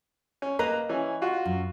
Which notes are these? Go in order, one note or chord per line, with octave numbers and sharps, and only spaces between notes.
C#4
A#3 B4 D#5 A#5
E3 C#4
F4 F#4
F#2